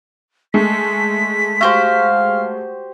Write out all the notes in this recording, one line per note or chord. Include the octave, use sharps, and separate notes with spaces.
G#3 A3 B6
F#4 G4 C5 F5